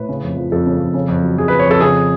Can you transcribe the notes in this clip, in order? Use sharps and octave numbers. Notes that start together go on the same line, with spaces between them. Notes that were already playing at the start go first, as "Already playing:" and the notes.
Already playing: A2 B4
C#3
F2
F3
F2 A4
C#3
F2
C#3
F2
F#3
F2 G#4
B4
C#3
C#5
F2 A4
C#3 G#4